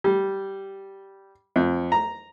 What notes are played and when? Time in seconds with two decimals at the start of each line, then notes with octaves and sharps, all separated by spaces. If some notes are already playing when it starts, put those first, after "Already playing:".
0.04 G3
1.56 F2
1.92 A#5